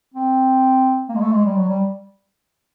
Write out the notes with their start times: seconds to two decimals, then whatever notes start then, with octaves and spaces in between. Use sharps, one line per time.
0.14 C4
1.09 A#3
1.15 G#3
1.21 A3
1.32 G#3
1.45 G3
1.56 F#3
1.68 G3